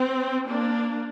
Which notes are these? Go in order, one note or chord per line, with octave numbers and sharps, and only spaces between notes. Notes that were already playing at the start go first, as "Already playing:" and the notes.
Already playing: C4
A#3 D4